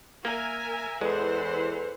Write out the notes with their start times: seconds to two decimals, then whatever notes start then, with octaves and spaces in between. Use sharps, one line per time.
0.25 A#3 A#4 E5 G#5
1.01 E2 E3 G#3 A4 B4 C5 F#5